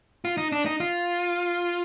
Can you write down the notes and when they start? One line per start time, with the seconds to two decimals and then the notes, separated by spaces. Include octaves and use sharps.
0.25 F4
0.37 D#4
0.52 D4
0.66 D#4
0.80 F4